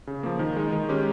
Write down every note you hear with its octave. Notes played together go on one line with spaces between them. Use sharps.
C#3
F3 A#3
D#3
G#3 D#4
D#3
G#3 C#4 G4